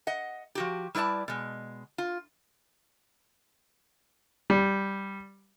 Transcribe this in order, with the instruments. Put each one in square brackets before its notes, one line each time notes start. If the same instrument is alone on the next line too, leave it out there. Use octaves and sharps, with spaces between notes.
[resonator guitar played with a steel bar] D#5 F#5
F3 F#4 G4
G3 E4 B4 D5 A5
B2 G#3
F4
[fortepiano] G3